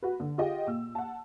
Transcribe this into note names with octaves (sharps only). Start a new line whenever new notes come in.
F#4 B4
D3
F4 G4 G#4 D#5 F#5 G5
A#2 E6
F#5 A5